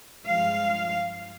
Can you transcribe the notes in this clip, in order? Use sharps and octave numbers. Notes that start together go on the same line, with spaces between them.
G2 F3 G#3 F5